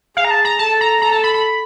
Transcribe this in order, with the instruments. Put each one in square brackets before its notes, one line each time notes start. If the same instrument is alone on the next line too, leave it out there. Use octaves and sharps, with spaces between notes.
[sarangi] G#4 [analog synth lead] F5
[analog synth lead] A#5
A5
A#5
[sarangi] A4 [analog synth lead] A5
[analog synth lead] A#5
[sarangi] A4 [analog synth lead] A#5
[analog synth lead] A5
B5
B5